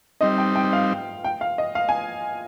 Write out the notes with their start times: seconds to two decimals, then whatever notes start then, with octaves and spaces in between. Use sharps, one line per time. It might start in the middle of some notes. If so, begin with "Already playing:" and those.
0.21 G3 C4 D#4 D#5
0.38 G5
0.56 G5
0.73 F5
1.24 G5
1.41 F5
1.58 D#5
1.75 F5
1.89 G#5